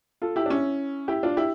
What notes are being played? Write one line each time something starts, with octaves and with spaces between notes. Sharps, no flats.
F4 A4
E4 G4
D4
C#4 E4
E4 G4
D4 F4
E4 G4